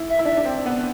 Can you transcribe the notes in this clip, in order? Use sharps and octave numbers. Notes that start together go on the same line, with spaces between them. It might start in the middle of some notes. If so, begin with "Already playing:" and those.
Already playing: E4
E5
E4
D4 E5
D4
C4
B3